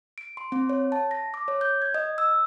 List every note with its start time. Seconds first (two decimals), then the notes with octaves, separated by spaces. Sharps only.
0.18 D7
0.37 C6
0.52 C4
0.69 C#5
0.92 A5
1.11 A#6
1.34 D6
1.48 C#5
1.61 G6
1.82 G#6
1.94 D#5
2.18 E6